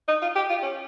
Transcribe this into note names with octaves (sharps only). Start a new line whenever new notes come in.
D#4
F4
G4
F4
C#4